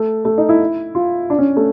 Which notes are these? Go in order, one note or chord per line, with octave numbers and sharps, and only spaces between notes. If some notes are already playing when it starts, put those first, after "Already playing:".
Already playing: A3
A3
D#4
E4
F4
D4
C#4
A3